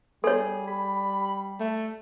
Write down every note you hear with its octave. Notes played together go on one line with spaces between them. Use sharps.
G3 G#4 A4 C#5
B5
A3